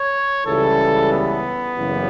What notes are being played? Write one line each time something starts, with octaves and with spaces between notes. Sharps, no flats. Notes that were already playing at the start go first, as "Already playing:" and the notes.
Already playing: C#5
C#2 C#3 E3 G3 A4
B3
F#1 F#2 C#3 E3 G3